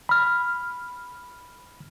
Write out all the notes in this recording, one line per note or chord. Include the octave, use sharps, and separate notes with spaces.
B5 F6